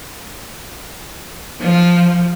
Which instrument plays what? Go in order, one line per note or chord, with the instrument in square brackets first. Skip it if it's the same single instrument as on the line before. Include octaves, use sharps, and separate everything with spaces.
[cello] F3